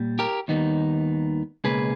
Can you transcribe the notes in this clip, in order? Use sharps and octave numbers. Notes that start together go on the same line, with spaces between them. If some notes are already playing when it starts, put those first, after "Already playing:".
Already playing: A#2 G3 A#3
G4 A#4
D#2 D#3 G3 B3 D#4
C#2 B2 A#3 G#4 B4